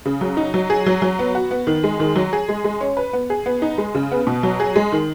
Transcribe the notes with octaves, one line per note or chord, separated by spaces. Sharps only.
C#3
F#3
D#4
F#3
G#4
F#3
F#3
B3
F#4
B3
D#3
G#3
D#3
F#3
G#4
G#3
G#3
C#4
B4
B3
G#4
B3
D#4
G#3
C#3
B3
B2
F#3
G#4
G#3
D#3